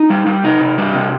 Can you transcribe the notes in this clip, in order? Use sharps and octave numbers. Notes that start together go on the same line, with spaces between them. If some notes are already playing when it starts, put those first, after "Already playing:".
Already playing: D#4
G3
G3
C3 D#4
C3
G3 D4
C3